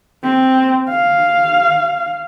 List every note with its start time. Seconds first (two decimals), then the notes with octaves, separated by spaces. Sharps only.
0.24 C4
0.90 F5